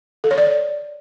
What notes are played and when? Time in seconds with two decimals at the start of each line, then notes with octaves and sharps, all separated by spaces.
0.24 A4
0.31 C#5
0.38 D5